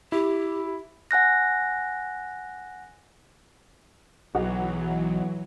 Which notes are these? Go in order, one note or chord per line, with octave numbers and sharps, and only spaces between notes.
E4 G4
F#5 G#5 F#6 A#6
B1 E3 F#3 D#4 F#4 G#4